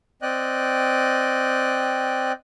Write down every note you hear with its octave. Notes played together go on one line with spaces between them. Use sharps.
C4 D5 D#5 G5 F#6